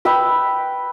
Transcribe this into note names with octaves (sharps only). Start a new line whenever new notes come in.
B4 G5 E6